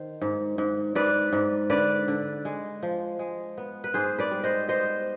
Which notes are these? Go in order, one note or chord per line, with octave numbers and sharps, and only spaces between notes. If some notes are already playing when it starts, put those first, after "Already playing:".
Already playing: D#3 C5
G#2
G#2
G#2 B4 D5
G#2
D3 B4 D5
D3
G#3
F3
G#3
B3
B4
G#2 G#4 C5
B4 D5
G3
C5 D#5
B3 C5 D#5